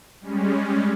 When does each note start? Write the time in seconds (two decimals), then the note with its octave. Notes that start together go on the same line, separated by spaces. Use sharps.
0.21 G3 G#3 C#4